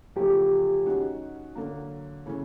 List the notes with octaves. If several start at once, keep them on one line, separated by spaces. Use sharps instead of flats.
E2 C#3 F3 A3 G4
D#3 G#3 C#4 F#4
D3 F#3 A#3
C#3 E3 A3 C#4